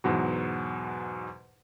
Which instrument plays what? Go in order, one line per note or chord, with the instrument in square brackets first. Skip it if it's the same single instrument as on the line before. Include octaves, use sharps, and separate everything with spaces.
[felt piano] E2 G#2 B2 F#3